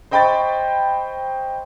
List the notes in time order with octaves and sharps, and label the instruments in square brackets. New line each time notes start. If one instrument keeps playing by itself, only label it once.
[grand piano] C5 D#5 G5 B5 C#6 A6